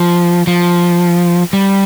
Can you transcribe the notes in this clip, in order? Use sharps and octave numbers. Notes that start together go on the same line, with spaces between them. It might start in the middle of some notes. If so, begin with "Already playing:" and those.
Already playing: F3
F3
G3